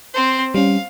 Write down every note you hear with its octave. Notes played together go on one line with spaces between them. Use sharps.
C4 C5
G3 C#4 F5